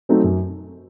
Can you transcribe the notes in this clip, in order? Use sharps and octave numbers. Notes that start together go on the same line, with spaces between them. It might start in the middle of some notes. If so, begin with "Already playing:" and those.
F#3 A3 C4 D#4
F#2